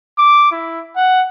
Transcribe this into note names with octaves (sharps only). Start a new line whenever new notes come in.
D6
E4
F#5